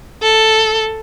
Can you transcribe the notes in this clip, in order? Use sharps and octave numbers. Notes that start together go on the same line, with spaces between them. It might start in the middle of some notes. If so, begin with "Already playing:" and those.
A4